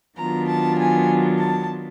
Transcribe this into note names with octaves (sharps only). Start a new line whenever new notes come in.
D#3 F#3 B3 D4 F4 A#5
A5
G#5
A5